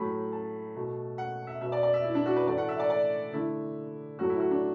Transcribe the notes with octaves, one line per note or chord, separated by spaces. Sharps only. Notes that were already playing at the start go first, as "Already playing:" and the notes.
Already playing: A2 F#3 A3 B5
A5
B2 A3
F#5
E5
B2 B3 E5
D5
D5
E5
E4
D4
F#4
B4
A2 E3 A3 D5
F#5
E5
D5
D5
D3 A3 E4
A2 F#3 A3 F#4
E4
F#4
D4